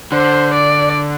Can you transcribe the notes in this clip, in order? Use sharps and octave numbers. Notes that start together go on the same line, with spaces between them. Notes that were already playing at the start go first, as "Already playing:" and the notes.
D3 C5
D5